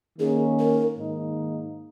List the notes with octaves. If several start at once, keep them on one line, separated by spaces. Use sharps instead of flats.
D#3 A#3 C#4 G#4
A#4
G#2 D#3 A#3 D#4